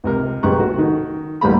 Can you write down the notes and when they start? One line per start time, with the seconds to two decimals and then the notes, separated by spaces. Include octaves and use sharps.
0.04 C#2 C3 A#4
0.43 B1 C#3 G4 A#5 C#6 F#6
0.58 A3 F#4
0.78 D#3
1.41 A1 D2 G3 A#3 A#5 B5